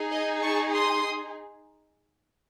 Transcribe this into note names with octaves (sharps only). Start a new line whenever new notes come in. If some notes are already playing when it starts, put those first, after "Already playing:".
Already playing: D#4 G#4
D#5
A5 C#6
C6 D#6